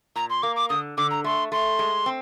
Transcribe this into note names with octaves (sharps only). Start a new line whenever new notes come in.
A#2 A#5
C6
A#3 D6
D6
D3 D#6
D3 D6
A#5
A3 C6
A3 C6
G#3
C4